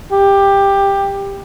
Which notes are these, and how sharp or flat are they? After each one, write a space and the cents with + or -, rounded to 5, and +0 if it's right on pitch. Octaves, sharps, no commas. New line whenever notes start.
G4 +15